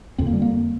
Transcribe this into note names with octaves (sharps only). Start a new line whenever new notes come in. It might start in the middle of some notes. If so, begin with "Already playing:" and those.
F2 D3 C4
A#3
G3
A#3